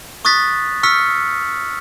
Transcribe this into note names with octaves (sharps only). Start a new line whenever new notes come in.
C#6 D#6 F#6 A6 B6
C#6 E6 F6 B6 C#7